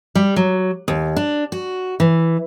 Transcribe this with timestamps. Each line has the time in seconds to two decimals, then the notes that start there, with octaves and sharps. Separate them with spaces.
0.15 G3
0.36 F#3
0.88 D#2
1.16 D4
1.52 F#4
2.00 E3